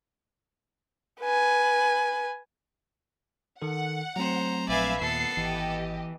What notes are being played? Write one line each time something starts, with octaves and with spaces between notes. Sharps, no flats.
B4 G#5
D#3 A4 F#5
F#3 A3 C4 C5 A#5
A#1 B4 D5 E5 F5 G#5
D#2 A#2 B3 A4 C7
G#1 E3 G4 D#5